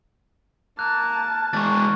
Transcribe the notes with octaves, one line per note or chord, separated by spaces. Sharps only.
A#3 A5 F#6
E2 G#3 A#3 C#6 A6